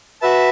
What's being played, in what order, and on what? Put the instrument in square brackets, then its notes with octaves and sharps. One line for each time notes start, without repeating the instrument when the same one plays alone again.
[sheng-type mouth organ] F#4 B4 E5 A5